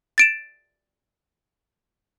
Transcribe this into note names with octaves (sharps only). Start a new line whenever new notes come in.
A6 D7 E7